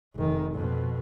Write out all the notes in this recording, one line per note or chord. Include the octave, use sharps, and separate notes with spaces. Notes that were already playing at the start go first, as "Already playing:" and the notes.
F1 D#3
F2 B2